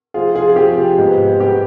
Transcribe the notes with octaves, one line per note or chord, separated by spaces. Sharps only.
C3 F3 C4 F4 G#4
F4 G#4
G#4
C3 F3 C4 G4
G#2 G3 B3
G#2 G3 B3 G4